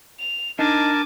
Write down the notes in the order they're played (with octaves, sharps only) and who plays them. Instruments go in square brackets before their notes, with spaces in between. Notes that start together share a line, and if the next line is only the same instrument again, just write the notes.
[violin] F7
[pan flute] D4 [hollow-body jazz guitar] D#4 [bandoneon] A#4 A5 [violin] G#5 D6